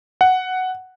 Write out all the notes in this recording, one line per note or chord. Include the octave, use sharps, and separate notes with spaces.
F#5